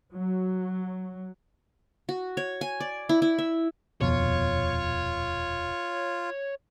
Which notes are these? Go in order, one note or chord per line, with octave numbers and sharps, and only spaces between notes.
F#3
F#4
C#5
G#5
D5
E4
E4
E5
D#1 F2 B2 F4 C#5